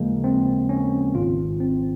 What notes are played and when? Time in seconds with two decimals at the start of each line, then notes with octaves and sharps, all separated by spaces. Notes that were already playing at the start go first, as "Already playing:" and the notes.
Already playing: D#2 C#3 F3 G#3 A#3
0.24 C4
0.69 C#4
1.14 G#1 G#2 D#3 F4
1.60 C4